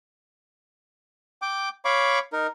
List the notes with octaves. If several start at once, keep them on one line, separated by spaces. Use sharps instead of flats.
G5 D6
C#5 F5 B5 C#6 D6
D#4 A#4